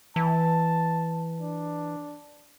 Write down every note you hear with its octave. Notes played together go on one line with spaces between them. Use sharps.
E3 A5
D4